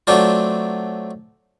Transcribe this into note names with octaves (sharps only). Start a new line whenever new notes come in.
F#3 A3 C4 D4 F4